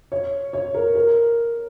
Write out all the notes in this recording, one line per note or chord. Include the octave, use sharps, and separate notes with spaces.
C#5
C#5
A#4
A#4